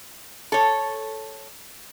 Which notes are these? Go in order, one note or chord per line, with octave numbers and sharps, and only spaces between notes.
A4 C#5